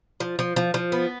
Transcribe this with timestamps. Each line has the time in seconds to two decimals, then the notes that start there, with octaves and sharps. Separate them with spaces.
0.20 F3
0.39 F3
0.56 F3
0.74 F3
0.92 B3